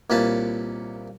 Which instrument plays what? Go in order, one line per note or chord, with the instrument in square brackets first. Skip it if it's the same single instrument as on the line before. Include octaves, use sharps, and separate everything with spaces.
[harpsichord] C2 A#2 A#3 C#4 B4 A5